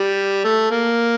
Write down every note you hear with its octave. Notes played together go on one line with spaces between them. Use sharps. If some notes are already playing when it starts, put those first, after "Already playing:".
Already playing: G3
A3
A#3